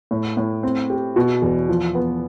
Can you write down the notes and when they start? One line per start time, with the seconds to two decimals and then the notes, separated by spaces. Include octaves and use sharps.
0.11 A2
0.37 A2
0.63 C4
0.90 G4
1.16 B2
1.42 E2
1.69 F3
1.95 B3